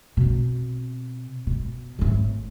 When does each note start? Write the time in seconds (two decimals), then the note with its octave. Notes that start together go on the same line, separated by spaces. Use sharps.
0.17 B2 C4
1.47 B2
1.99 G#1 A2